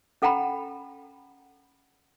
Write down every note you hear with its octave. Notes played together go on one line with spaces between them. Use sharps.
C#4 A4 F#5 G5 A#5 B5